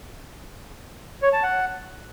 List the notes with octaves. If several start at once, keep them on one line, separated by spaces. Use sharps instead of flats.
C#5
A5
F#5